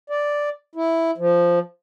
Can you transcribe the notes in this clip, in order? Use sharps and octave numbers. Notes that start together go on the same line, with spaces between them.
D5
E4
F3